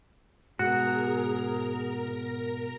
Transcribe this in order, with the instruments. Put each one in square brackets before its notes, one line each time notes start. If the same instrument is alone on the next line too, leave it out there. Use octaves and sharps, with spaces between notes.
[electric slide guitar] G#2 B2 [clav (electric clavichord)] F#4 [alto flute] G#4 [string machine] A#4 A#5